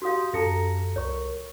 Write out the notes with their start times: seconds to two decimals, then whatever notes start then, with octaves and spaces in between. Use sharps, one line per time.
0.02 F#4 G4 F5 C6 D#6 G6
0.34 F#2 A4 A5 A#5 A#6 C#7
0.96 C2 A#4 C#5 C#6